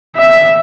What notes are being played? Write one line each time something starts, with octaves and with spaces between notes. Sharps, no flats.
E5